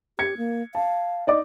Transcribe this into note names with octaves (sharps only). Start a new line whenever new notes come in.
G4 G#6 C#7
A#3
F5 A5
D#4 D5 D6